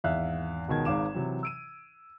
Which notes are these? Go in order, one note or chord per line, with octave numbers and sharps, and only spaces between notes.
G#1 E2 E5 F5 F#6
C#2 B2 D#3 G#6
G#1 G#2 F5 D6 E7
C3 E3 F#3
E6 D7 D#7